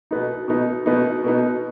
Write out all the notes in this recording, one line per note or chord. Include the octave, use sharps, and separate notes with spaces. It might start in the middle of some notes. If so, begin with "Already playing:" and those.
B2 B3 D#4
B2 B3 D#4
B2 B3 D#4
B2 B3 D#4